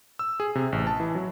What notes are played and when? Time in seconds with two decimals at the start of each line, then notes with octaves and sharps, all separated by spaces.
0.19 E6
0.40 G#4
0.55 C3
0.72 A1
0.87 A5
1.00 E3
1.15 F#3